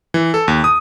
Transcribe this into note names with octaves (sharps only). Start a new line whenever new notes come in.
E3
A4
D#2
D#6